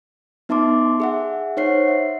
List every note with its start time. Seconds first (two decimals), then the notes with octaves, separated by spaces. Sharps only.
0.49 B3 D#4 E5 A5 C6 D6
1.00 G#4 E5 F#5
1.57 D#4 C5 C#5 F#5 C7
1.88 E5